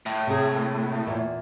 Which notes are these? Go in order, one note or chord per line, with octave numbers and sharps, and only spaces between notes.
A2
C3 G#4
E2 A#2